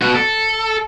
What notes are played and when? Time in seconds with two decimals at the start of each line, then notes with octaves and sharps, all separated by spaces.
0.02 B2 F#4
0.15 A4